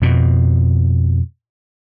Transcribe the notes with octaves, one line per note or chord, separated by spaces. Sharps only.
F2 B2